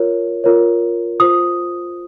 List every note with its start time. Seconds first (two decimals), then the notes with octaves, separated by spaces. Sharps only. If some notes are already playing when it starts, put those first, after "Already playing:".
Already playing: F4 A#4 C#5
0.44 F4 A#4 C#5
1.20 F4 C5 D#6